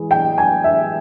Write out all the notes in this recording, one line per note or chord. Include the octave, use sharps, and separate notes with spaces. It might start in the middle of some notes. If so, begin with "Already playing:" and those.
Already playing: E3 G#3
G5
G#5
E5